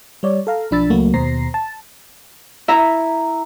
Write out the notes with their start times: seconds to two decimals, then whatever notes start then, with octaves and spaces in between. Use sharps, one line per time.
0.23 G3 C#5 D5
0.47 A4 F5 A#5
0.71 B1 F3 D4 B5 E6 A6
0.90 C#2 F#3 A3 A#3 F#4
1.14 D#2 B2 C5 A#5 A#6 C7
1.54 A5
2.68 E4 E5 A#5